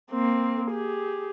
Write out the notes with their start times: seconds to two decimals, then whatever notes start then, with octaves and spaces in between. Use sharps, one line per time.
0.11 A#3 C4
0.71 G4 G#4